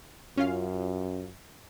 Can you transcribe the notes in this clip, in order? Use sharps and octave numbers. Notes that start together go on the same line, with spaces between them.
F#2 C#4 F4 F5